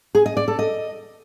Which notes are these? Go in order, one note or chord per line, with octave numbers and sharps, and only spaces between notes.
G#4
D#5
D5
A4
D#5